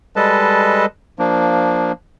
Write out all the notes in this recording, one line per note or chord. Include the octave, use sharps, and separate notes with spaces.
G3 G#3 A4 B4 D#5 A5
F3 A#3 D4